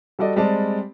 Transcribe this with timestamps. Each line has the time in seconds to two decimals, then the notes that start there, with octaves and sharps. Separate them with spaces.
0.19 G3 F#4 A4 D5 D#5
0.36 G3 G#3 C4 D5 A5